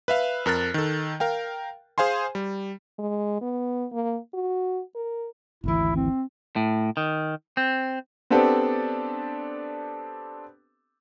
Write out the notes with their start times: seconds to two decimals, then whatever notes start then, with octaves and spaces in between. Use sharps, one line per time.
0.08 B4 E5 F5
0.46 F2 A#4 F#6 A6
0.74 D#3 A4
1.20 A#4 F5 G5
1.98 G#4 C5 F5 G#5 C6
2.35 G3
2.99 G#3
3.42 B3
3.92 A#3
4.34 F#4
4.95 A#4
5.64 G#1 D2 E3 E4
5.96 C4
6.56 A2
6.97 D#3
7.57 C4
8.30 B3 C4 D4 G4 A4